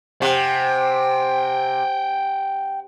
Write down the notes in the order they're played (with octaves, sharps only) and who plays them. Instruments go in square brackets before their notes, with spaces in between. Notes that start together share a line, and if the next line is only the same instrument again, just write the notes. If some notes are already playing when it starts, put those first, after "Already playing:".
[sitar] C3 [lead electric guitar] F#5 G5